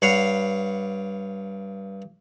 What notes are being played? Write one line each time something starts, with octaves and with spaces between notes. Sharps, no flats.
G2 C#5 F5 F#5 B5